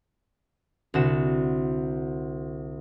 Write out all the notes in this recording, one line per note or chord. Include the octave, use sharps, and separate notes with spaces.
C2 D3 F#4 E7